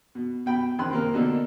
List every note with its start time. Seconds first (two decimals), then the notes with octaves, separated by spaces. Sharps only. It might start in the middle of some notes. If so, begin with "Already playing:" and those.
0.15 B2
0.46 B2 G5 B5
0.79 D#3 C4 C6 F#6
0.91 C3 A#3 A#4
1.13 B2 D3 A#3 D4 D#4 A4